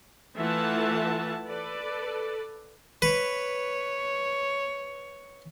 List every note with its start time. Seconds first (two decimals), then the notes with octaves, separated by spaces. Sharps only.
0.36 E3 A3 F4 E5 F#5 A5
1.47 A4 B4 D5
3.02 B4 C#5